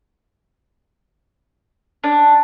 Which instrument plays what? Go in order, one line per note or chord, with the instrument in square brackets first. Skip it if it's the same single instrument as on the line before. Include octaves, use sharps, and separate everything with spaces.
[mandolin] D4